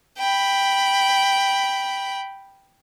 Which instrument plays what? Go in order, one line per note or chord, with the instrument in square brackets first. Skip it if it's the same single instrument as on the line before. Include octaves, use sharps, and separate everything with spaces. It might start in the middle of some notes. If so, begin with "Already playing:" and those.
[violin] G5 B5